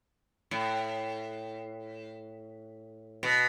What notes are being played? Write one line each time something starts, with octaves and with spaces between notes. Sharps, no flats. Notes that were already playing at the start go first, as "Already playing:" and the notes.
A2
B2